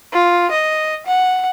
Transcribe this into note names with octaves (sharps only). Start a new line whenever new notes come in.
F4
D#5
F#5